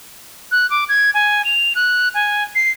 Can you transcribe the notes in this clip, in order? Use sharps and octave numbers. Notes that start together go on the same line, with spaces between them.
F#6
D6
G#6
G#5
F7
F#6
G#5
C7